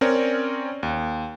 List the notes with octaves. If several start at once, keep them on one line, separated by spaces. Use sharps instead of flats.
C4 C#4 A#4 C#5 D5
D#2